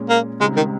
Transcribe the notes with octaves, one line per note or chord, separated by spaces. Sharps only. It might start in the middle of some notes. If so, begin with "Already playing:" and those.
Already playing: A#2 G#3 C#4
A#3
C#2 C#3 G3 G#3 C4 D#4
D#3